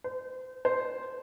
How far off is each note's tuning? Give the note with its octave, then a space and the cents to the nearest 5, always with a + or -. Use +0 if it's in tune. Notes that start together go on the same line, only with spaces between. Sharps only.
C5 -30
C5 -5